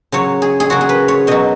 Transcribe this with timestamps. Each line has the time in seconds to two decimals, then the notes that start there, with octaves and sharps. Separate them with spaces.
0.12 C#3 F#3 C#5
0.42 G#4
0.60 G#4
0.70 C#3 F#3 F#4
0.81 G#4
0.89 B4
1.08 C#5
1.27 B2 F#3 D#5